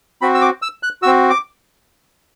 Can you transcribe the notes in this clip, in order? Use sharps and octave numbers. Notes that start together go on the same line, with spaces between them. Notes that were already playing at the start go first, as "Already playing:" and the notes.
C4 F#4 B5
E6
D6
E6
F#6
C4 F#4 E6
D6